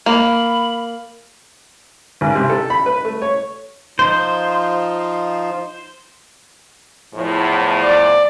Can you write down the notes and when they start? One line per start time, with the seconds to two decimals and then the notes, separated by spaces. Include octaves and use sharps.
0.06 A#3 B5
2.21 G#1
2.35 C3
2.50 A4
2.70 B5
2.86 B4
3.05 A3
3.22 C#5
3.99 F3 D#4 F4 C5
7.15 E2 A2 F3
7.82 D5